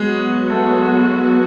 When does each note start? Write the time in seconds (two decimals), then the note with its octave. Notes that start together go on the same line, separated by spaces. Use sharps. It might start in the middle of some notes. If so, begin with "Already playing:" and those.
Already playing: F#3 G#3 B3 F#4 G#4
0.50 A3 A4